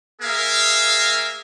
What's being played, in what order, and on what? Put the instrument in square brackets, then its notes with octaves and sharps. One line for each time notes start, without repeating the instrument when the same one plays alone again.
[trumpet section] A#3 G#4 A#4 E5 F5